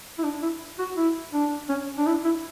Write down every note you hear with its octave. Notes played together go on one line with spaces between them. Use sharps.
E4
D4
E4
F#4
E4
D4
C#4
D4
E4
E4